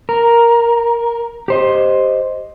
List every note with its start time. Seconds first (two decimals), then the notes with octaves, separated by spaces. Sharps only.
0.09 A#4
1.48 G4 C5 D#5